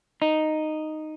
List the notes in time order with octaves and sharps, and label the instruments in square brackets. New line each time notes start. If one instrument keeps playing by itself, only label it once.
[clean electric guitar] D#4